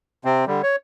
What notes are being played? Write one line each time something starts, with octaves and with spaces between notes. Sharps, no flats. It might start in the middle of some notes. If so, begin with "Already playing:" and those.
C3 C4
D3 G3
C#5